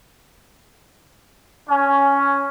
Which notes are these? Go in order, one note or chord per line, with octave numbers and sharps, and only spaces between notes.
C#4